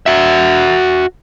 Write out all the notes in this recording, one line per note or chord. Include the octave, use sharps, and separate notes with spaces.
F#4 E5